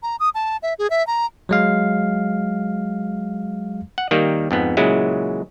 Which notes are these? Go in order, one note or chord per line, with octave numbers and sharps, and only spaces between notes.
A#5
D#6
A5
E5
G#4
E5
A#5
F#3 G#3 F5
F#5
D#3 G3 A#3
F2 G#2 B3
A#2 C#3 F#3 G#3 E4